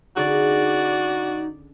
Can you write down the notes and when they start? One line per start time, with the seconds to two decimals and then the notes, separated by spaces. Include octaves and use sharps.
0.16 D3 C#4 D#4 F#4 G#4 D5